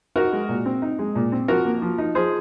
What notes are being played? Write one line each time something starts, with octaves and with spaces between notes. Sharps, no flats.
D#4 F#4 A#4
G#3
A#2
C4
D#4
G#3
A#2
C4
F3 F#4 A#4
A#3
F3
D#4
F3 G#4 C5